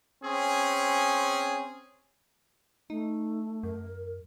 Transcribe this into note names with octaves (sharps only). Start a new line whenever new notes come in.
C4 C#4 G#4
A3 D#4
F#2 A#4